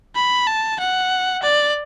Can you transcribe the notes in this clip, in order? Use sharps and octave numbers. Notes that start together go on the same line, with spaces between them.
B5
A5
F#5
D5